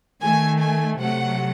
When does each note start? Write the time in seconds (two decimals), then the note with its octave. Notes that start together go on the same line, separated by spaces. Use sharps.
0.22 D#3 A3 G#5
0.61 G#5
0.99 C3 F#3 A3 F#5